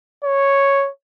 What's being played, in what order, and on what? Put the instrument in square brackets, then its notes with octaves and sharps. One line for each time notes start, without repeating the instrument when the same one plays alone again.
[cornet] C#5